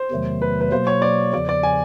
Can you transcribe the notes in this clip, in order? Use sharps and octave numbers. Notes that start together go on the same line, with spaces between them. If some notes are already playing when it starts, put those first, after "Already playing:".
Already playing: C5
E2 C3 D#3 F#3 A3
B4
B4
B2 F#3 A#3 C5
C#5
D5
E2 C#3 F3 D5
D5
G#5